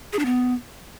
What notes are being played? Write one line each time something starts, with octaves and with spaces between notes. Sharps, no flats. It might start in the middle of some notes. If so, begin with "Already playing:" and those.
G#4
D4
B3